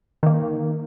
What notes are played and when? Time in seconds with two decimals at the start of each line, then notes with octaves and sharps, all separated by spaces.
0.23 D#3 A#3